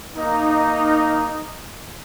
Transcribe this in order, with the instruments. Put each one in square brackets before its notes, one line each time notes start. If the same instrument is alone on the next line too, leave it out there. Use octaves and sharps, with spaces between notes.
[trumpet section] A#3 D#4